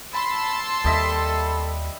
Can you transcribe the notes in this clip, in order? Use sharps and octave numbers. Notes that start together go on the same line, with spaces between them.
A5 B5 C6 E6
D#2 G3 A4 D#5 E5